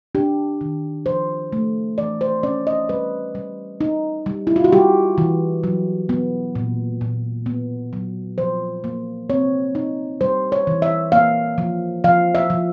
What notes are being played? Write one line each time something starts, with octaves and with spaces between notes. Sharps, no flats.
D4 G4
D#3
F3 C5
A3
E3 D5
C5
C#4 D5
D#5
G3 B4
G3
D#4
G3
E4
F4
F#4
G3 G4
E3
F#3
B3
A#2
A#2
B3
F#3
F3 C5
A#3
C4 C#5
D#4
G3 C5
C#5
E3
E5
A#3 F5
F3
F3 F5
E5
F3